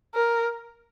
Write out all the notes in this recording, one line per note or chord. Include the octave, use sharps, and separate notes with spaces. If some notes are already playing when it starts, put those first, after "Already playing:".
A#4